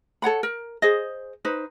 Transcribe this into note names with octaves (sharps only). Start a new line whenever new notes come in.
A4 C#5 F#5 B5
A#4
G#4 C5 D#5
D#4 B4 C5